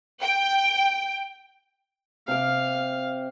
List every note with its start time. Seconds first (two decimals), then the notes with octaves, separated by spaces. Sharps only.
0.22 G5
2.28 C3 F5 D6